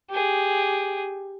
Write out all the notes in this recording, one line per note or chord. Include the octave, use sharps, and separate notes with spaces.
G4 G#4